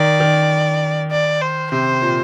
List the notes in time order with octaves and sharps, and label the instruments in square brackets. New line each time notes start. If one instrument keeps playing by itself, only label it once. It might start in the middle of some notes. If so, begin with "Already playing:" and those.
Already playing: [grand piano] D#3 [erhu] D5
[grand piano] D#3
[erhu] D5
C5
[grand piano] C3 [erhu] C5
[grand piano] A#2